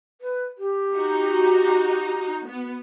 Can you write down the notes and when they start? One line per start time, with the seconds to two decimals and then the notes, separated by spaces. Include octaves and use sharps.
0.21 B4
0.58 G4
0.94 D#4 F#4
2.46 B3